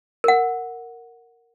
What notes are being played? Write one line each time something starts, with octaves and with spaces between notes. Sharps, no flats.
A#4 F#5